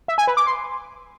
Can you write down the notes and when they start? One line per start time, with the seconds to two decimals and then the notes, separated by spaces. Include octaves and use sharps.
0.08 E5
0.18 G#5
0.27 B4
0.37 D6
0.46 C6